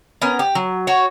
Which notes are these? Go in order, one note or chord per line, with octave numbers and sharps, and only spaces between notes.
B3 C#4 A#4
G4
F#3
F#4 C#5